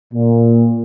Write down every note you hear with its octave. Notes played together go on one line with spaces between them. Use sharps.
A#2